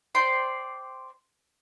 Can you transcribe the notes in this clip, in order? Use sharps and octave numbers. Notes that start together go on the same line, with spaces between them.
C5 D5 G5 C6